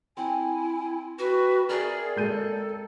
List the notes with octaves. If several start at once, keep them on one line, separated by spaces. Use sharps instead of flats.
C4 E4 G#5
F#4 B4
G#4 A#4 D5 E5
G#3 A4 G6 D#7